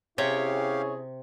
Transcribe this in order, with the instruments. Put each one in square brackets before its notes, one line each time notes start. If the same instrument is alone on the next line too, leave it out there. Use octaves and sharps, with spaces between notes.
[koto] C3 [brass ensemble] C#4 E4 G#4 [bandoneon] G4 F5 [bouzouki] C#5